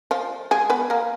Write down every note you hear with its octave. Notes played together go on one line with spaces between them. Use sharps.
F3 F4
G#3 G#4
B3 B4
A#3 A#4